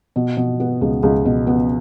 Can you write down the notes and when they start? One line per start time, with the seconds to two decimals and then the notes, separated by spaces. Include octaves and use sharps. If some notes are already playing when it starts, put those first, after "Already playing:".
0.16 B2
0.37 B2
0.60 B3
0.81 C#2
1.03 C#2
1.25 B2
1.47 B3